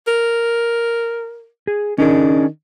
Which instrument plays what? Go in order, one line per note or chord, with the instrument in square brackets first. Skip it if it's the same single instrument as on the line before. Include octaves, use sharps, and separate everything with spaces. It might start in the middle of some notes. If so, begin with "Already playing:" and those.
[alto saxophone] A#4
[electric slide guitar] G#4
[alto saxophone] D#3 [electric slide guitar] C#4 D4 G#4